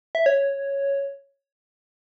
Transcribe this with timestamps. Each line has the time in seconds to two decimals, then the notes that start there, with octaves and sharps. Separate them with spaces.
0.15 E5
0.26 C#5